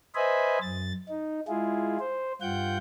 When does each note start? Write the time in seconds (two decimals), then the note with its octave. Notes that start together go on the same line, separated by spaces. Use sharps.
0.15 B4 C5 D#5 E5 G#5 B5
0.61 F#2 A6
1.09 D#4
1.48 G#3 E4 F4 G#4
1.99 C5
2.41 G2 F4 F#5 G5 G6